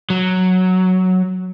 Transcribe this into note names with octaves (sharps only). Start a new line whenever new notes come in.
F#3